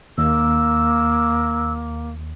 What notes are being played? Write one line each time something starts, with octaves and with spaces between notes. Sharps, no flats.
D#2 A#3 E6